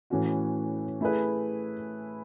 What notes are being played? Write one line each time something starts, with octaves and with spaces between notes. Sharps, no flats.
A2 E3 A3 C#4 F#4
A3 E4 G#4 B4